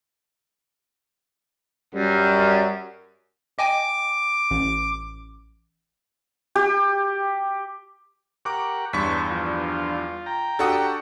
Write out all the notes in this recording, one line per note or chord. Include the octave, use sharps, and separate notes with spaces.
F#2 G3
D#5 G5 G#5 D6
A1
G4
G4 A#4 F#5 C#6 D6
E2 G2 C#5 A5 C6 C#6 B6
F3 D4 F4
G5 A#5
D4 F#4 G4 A4 F#5 D#6